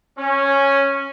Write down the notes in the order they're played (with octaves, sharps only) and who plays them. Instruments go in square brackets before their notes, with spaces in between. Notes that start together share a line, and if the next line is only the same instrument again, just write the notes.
[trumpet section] C#4